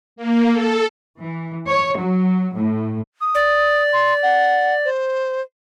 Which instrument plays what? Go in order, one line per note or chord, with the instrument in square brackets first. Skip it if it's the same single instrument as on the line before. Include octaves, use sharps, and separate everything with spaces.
[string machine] A#3
A4
[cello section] E3
C#5
F#3
A2
[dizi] D#6
[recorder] D5
[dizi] C6
F#5
C5